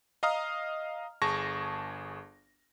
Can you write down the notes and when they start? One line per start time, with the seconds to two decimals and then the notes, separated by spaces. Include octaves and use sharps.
0.23 D#5 F5 A#5 D#6 F6
1.22 G1 G#4 A5 C#6 A#6